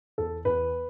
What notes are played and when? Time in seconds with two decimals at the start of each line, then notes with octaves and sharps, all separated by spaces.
0.18 E2 A4
0.45 E2 B4